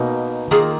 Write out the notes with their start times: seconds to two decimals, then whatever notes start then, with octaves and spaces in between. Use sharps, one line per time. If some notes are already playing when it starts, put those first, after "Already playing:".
Already playing: B2 A#3 D#4
0.51 D#3 A#3 F4 G#4